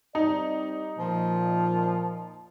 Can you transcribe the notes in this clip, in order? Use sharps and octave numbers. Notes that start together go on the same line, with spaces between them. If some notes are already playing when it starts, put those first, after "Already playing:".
G3 C4 D#4 D5
A#2 F3